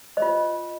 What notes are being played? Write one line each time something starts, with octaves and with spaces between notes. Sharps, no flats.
C5 D#5
F4